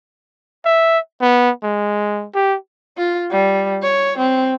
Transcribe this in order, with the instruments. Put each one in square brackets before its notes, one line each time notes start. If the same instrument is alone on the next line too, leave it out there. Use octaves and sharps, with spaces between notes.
[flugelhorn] E5
B3
G#3
G4
[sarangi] F4
G3
C#5
C4